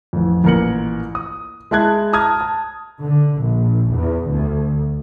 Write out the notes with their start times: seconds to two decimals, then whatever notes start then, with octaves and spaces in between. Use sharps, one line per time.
0.13 A1 F2
0.44 A1 A#2 A#4 C#7 F#7
1.15 D#6
1.71 G#3 E4 A5 F#6 G#6
2.13 A5 A#5 D#6 F6 G#6
2.41 A5
3.00 D3
3.41 A#1
3.93 E2
4.27 D2